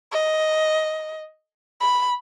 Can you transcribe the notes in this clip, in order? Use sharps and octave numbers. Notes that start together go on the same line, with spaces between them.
D#5
B5